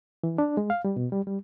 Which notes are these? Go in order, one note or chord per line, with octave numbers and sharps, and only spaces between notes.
E3
D4
G#3
F5
G3
B2
G3
G3